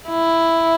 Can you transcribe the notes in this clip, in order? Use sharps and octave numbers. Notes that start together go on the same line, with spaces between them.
E4